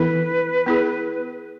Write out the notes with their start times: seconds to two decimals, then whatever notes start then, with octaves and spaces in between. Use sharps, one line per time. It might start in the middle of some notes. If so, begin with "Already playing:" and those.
Already playing: E3 B3 E4 A4 B4
0.66 B3 E4 G#4